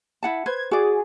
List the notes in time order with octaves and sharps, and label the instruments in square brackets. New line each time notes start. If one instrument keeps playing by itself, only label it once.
[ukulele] E4 F#5 A5
[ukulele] B4 C5 [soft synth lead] G#6
[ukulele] F#4 D5 [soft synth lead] G#4